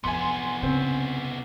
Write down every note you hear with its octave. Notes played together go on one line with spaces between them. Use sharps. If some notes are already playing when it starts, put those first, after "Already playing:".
C2 F2 E3 B3 G#5 C6
C#3 C4